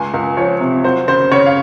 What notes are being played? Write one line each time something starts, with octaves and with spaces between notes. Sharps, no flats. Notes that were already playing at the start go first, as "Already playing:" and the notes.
Already playing: C#2 G#5
C#2
F3 C#5
C3
F#3 C5
C#3 C5
C#3 C#5
F5